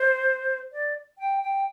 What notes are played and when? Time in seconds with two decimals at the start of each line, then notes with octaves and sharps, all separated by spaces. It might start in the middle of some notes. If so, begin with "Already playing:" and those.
Already playing: C5
0.73 D5
1.18 G5
1.41 G5